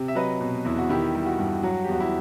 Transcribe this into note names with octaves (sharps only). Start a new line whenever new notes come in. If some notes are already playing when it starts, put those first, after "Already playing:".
Already playing: C3
E5
F#3 B4 D#5
B2
E2 E4
F#4
D#3 E4 G4
G3 E4
F#4
G2
F#3 F#4
G4
E2 F#4
E4